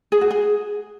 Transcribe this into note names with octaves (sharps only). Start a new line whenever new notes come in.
G#4
F#4
G#4